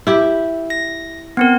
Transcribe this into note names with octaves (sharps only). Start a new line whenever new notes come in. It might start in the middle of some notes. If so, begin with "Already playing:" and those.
E4 G4
A#6
B3 C4 A#4